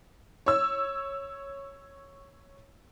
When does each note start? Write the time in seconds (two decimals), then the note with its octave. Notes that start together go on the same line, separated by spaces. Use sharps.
0.46 C#5 E6